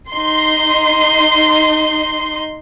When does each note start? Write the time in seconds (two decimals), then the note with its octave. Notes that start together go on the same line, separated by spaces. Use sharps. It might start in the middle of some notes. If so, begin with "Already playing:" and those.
0.11 D#4 C6